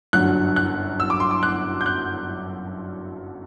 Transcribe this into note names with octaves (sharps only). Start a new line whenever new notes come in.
G1 F#2 D3 F#3 F#6
F#6
E6
D6
C6
D6
F#6
G6
F#6